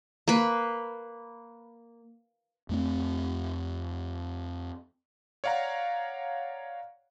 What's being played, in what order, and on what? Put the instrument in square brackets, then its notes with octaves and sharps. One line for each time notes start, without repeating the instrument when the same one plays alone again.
[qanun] A#3 B4
[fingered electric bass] F2 A3 C4
[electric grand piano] C#5 D5 F5 F#5 A#5